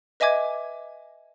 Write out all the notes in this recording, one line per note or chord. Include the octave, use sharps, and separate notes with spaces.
B4 D#5 E5 G#5 D6 G#6